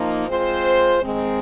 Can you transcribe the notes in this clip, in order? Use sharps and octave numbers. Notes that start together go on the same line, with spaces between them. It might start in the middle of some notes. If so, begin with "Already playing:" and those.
Already playing: F3 A#3 D#4
G#3 C4 F4 C5
D#3 G#3 C4